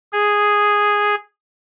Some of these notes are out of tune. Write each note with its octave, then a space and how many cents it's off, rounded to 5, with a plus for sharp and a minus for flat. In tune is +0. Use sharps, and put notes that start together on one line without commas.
G#4 -5